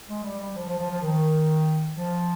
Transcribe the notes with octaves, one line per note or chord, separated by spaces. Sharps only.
G#3
G3
G3
F3
F3
F3
F3
D#3
F3